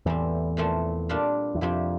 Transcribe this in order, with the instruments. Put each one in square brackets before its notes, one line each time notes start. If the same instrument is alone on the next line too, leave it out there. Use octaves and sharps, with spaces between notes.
[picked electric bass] E2 E3 [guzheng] A2 G3 C4
[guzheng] A#2 F3 A3 C4
A#2 G3 D4 F4
[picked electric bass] E2
[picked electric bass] F2 [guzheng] C3 G3 C4 E4 G4